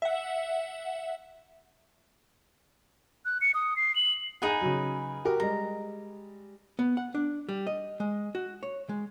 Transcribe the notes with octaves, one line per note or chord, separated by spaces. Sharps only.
E5 F#5
F#6
C#7
D#6
C7
F#7
D#4 G#4 B4 F#5 G#5
C#3 F#3
F#4 G4 A#4
G3 G#3 A#5
B3
F#5
D4
G3
D#5
G#3
F#4
C#5
G#3